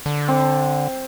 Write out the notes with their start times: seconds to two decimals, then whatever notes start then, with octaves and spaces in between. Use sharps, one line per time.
0.06 D3
0.28 C4